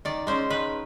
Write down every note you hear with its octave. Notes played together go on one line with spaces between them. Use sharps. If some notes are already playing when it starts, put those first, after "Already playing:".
D#3 D5
G#3 C#4 C5
D#3 B4